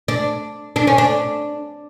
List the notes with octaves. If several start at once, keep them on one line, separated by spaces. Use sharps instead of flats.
D4
D4
C#4
D4